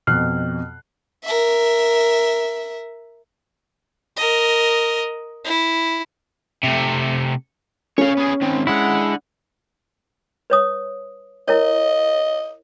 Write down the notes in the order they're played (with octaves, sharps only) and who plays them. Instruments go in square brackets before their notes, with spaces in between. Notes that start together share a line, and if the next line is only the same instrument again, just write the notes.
[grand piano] F2 F#6 C7 [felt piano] B2 [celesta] F6
[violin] A#4 E5
[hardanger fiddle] A#4 D#5
E4
[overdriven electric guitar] C3 A3
[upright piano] C#4 [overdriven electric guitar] C#5 F5
[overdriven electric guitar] B3 G#4
D#3 C4
[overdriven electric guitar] D3 F#5 [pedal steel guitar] G#3 E4
[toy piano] B4 C#5 D#6
[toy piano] E4 A#4 C#5 [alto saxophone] D#5